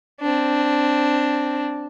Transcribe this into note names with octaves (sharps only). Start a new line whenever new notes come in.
C4 D4